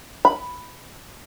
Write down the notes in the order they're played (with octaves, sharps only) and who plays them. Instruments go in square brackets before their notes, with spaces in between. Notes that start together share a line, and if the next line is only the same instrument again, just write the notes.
[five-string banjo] B5